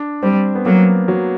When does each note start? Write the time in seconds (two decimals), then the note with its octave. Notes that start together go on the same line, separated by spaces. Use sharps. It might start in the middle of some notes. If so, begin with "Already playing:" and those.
Already playing: D4
0.23 G3 C4
0.55 B3
0.66 F#3 A#3
1.08 F#3